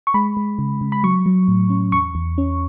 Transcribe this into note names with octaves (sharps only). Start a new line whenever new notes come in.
C#6
G#3 B5
G#3
C#3
C#3
B5
F#3 C#6
F#3
A2
C#4
E2 C#6
E2
C#4